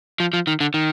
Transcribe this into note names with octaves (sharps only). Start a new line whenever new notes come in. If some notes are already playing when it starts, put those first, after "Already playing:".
F3
F3
D#3
D3
D#3